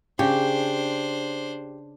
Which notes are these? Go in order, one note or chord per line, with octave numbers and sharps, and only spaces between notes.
C#3 D4 G4 C5